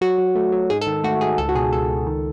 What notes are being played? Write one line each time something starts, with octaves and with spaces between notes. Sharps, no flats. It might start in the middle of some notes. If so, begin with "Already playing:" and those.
F#3 F#4
F#3
A3
F#3
G#2 G#4
A4
D#3
A3 F#4
G#2 G#4
C#2 A4
F#4
B2 G#4
C#2 A4
C#2
D#3